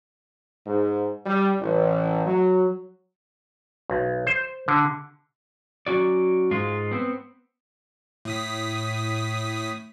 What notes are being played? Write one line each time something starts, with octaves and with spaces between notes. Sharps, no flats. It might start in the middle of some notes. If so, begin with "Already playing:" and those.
G#2
G3
A1
F#3
B1
C5
D3
F#3 C#4 F#4 D5
G#2 G#3 F4
B3 C4
A2 D#6 B6